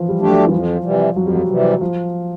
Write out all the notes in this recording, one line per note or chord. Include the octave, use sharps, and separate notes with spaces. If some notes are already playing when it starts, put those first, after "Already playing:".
Already playing: E3 F3
G3
A3 D4 G4
F#3
E3
F2 F3
C3 E3 G3
F2 F#3
G3
F#3
C3 E3 G3
F3